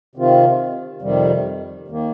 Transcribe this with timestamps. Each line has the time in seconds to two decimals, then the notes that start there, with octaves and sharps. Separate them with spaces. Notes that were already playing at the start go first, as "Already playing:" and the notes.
0.15 C3 D#3 C4 F4
1.02 F2 C3 D#3 G3
1.88 D#2 D#3 A#3